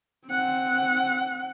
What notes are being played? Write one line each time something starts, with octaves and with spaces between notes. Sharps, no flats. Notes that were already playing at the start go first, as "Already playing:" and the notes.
C4 F#5